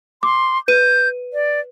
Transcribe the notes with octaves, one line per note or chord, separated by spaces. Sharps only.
C6 D6
B4 G6 D#7
D5